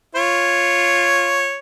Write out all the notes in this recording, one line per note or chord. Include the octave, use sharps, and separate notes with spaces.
F4 C#5